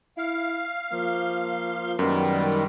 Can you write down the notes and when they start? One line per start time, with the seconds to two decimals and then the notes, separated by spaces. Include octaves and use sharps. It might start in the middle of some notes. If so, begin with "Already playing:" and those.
0.17 E4 F5
0.93 F3 A#3
1.99 F#2 D#3 G3 A#3 B3